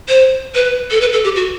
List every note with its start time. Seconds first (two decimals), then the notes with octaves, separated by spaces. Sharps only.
0.09 C5
0.55 B4
0.91 A4
1.01 B4
1.13 A4
1.24 G4
1.35 F#4